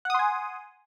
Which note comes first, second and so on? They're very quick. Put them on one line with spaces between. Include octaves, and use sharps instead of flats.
F#5 D#6 C6 G#5